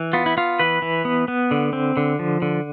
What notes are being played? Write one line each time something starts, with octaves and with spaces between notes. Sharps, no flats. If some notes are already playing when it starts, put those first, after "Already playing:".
Already playing: E3
B3 F4
E4
B3 F4
E3 B4
E3
B3
B3
D3
C4
D3
F3
D3